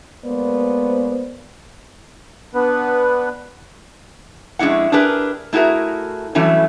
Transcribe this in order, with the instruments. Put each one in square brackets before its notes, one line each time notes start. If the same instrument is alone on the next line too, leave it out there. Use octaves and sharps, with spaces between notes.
[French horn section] G#3 A#3 B3 C5 D5
[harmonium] B3 D4 B4
[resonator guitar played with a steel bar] F2 G#3 C#4 D4 E4 F#5
D4 E4 G4 G#4 A#4 B4
A3 E4 F#4 G#4 A#4
E3 F#3 G3 A3 C#4 E4